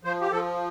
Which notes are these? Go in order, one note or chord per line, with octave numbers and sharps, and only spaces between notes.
F3 C5
G4
F3 A4